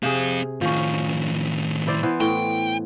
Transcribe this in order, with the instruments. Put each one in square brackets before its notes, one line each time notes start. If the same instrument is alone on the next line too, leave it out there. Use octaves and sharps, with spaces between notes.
[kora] C3 G#4 [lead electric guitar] C4 F5
[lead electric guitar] A2 D#3 [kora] F3 C#4
[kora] E4 C5 D5
E3 B3 C5
[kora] A2 [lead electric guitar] G5